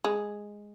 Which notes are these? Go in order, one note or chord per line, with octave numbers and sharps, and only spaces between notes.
G#3